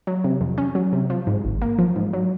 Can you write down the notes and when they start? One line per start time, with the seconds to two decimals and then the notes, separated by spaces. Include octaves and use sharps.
0.07 F#3
0.24 C3
0.41 F2
0.58 C#4
0.75 F#3
0.93 C3
1.10 F3
1.27 G#2
1.45 G#1
1.62 A#3
1.79 F3
1.96 G#2
2.13 F#3